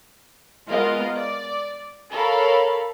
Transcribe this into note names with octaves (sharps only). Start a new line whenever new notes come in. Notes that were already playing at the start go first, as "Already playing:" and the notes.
G#3 B3 F4 A#4 D#5 F5
D5
A4 A#4 C#5 F5 B5